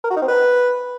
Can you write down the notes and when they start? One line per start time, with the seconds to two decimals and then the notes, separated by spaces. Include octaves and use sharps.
0.04 A#4
0.10 F#4
0.16 D#4
0.22 C4
0.28 B4